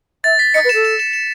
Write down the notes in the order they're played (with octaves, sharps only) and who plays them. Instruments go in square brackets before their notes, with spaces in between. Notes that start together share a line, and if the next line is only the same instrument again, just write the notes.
[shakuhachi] E5 [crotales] A6
[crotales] B6
[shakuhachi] D#5 [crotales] C#7
[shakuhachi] B4
[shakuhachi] A4 [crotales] E7
[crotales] E7
E7
E7